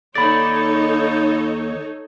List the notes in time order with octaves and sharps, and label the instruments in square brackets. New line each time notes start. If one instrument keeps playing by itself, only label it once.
[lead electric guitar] D#2 D5 [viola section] D#4 A4 C#5 [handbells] B5 A6